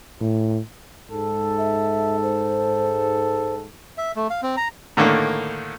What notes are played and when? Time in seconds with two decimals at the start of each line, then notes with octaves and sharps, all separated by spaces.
0.21 A2
1.11 G#2 A4
1.58 E5
2.23 C5
3.98 E5
4.16 A3
4.30 F5
4.42 C4
4.57 A#5
4.97 A2 D3 D#3 A#3